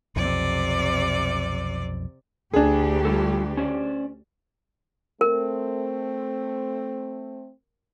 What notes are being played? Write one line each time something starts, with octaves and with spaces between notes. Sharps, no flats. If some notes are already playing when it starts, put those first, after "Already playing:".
B1 F2 C3 D5
D2 D4 G4 G#4
G3 F4 A4
C#4 C5 D5
A3 C4 A#4